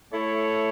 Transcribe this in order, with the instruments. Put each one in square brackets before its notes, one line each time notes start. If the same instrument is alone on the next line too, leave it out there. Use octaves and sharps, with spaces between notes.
[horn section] A3 E4 A4 C#5